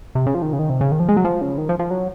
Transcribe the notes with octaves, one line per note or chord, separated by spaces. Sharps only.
C3
C#3
F3
D#3
C#3
D#3
C3
C#3
D#3
F3
G#3
F#3
F3
C#3
D#3
F3
F3
F#3